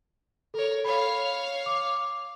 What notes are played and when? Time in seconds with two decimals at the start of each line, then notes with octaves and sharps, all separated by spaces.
0.54 A4 A#4 C#5
0.84 C#5 F5 B5
1.66 D6